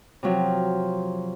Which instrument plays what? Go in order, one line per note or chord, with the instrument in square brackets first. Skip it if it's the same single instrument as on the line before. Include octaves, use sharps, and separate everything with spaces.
[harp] C3 F3 F#3